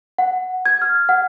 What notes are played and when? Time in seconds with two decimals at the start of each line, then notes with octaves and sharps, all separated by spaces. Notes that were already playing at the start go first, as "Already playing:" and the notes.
0.18 F#5
0.66 G#6
0.82 F6
1.09 F#5